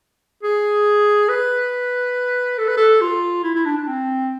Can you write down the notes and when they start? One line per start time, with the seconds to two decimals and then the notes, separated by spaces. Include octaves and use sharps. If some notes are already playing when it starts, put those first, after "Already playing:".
0.43 G#4
1.29 B4
2.58 A4
2.68 B4
2.77 A4
3.01 F4
3.44 E4
3.55 E4
3.65 D4
3.77 D4
3.87 C4